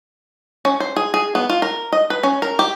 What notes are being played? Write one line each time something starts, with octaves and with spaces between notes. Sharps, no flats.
C#4
C5
G#4
G#4
B3
F4
A#4
D#5
B4
C#4
A#4
G4